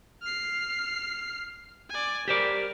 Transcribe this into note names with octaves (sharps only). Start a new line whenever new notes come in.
F6 C7
D5 G#5
G4 A#4 C5 D5